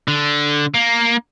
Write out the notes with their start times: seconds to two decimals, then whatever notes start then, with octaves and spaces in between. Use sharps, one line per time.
0.08 D3
0.74 A#3